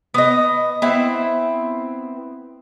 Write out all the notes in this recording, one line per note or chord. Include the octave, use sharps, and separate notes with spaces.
B3 D#5
B3 C4 E4